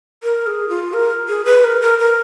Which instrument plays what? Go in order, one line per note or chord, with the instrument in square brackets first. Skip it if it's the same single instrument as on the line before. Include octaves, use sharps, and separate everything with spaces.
[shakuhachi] A#4
G#4
F4
A#4
G#4
B4
A#4
A#4
A#4